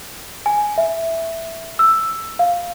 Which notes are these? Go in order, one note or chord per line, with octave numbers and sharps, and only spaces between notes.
G#5
E5
E6
F5